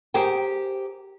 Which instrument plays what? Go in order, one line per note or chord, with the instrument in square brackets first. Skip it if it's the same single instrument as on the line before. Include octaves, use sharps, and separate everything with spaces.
[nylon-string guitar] G4 G#4 A#4 C5 G5